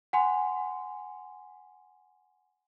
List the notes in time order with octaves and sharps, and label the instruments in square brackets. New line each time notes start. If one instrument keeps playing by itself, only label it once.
[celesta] F#5 G#5 C6